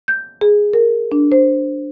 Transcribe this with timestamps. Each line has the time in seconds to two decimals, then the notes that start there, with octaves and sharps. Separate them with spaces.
0.08 G6
0.41 G#4
0.73 A#4
1.12 D4
1.32 C5